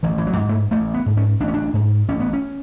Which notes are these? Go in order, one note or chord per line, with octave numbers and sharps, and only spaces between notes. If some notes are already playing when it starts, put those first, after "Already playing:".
A1 E3
E3
F#3
G#2
A3
A1 A3
B3
G#2
C#4
A1 D4
C#4
D4
G#2
A1 C#4
B3
C#4